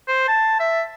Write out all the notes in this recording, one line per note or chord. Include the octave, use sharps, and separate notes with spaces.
C5
A5
E5